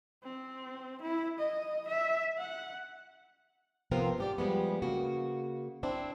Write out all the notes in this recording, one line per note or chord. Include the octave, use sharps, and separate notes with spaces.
C4
E4
D#5
E5
F#5
C3 F3 B3 C4 F4 A#4
G#2 G4 D5
F3 G3 G#3 B3
C#3 A#3 F#4
C4 D4 E4